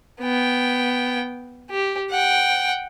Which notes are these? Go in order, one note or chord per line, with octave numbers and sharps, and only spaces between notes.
B3 G5
G4
F#5 G5